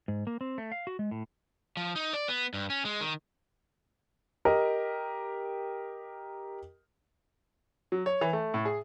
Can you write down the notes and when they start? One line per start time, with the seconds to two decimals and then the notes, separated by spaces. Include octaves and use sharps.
0.08 G#2
0.27 A#3
0.41 C4
0.58 A3
0.72 F5
0.87 F#4
0.99 G#3
1.11 A2
1.77 F3
1.96 D#4
2.13 D5
2.28 B3
2.54 G2
2.70 C#4
2.85 G#3
3.01 D#3
4.45 G4 A#4 D#5
7.92 F#3
8.06 C#5
8.21 E3
8.33 A3
8.54 A2
8.65 G#4